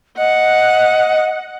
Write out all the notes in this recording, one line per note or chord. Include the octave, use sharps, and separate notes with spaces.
D#5 F#5